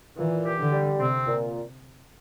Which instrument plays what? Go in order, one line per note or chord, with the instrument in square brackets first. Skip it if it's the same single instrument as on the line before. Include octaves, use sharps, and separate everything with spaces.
[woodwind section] A#2 [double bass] E3
[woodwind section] G4
[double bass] D3
[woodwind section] G3
[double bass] C3 [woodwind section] C4
[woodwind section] A#2